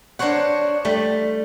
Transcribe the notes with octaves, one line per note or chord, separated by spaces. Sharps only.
D4 A#4 C5 C#5 F#5
G3 A3